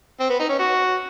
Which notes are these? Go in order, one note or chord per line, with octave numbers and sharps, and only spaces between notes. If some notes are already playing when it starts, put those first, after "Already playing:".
C4
B3
D#4
C#4
F#4